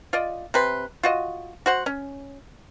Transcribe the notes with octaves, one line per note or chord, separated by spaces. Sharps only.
F4 D5 D#5
C3 B4 C6
F4 F#4 D#5
F#4 C5 F#5
C#4